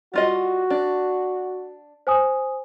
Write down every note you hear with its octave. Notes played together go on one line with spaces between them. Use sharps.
G3 F4 F#4 D#5
D4
C5 G#5 D#6